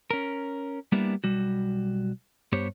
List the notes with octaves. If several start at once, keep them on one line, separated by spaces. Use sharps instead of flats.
C#4 A#4
G3 A#3 B3 D4 E4 G4
B1 G3 F#4
G2 B3 G4 C5 C#5